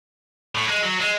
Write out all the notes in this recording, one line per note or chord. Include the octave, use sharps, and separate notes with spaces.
A2
G#3
F#3
G#3